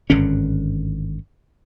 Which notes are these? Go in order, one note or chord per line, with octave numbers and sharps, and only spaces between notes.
G#1 G2 D3 C#4